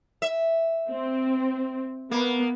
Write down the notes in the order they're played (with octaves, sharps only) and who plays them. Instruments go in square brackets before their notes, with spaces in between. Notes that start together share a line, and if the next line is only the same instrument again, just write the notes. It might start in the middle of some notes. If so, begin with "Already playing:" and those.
[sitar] E5
[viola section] C4
[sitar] A#3 [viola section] B3